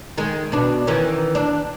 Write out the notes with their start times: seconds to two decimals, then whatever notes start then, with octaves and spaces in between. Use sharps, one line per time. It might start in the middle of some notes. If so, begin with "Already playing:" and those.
0.17 D#3 G#3
0.52 B2 D4
0.87 D#3 E3 C#4
1.35 D4